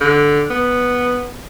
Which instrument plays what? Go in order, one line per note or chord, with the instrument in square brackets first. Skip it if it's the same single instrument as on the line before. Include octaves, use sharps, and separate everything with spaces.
[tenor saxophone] D3
B3